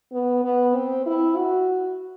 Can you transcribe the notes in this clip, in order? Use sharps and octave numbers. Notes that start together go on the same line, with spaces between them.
B3
B3
C4
E4
F#4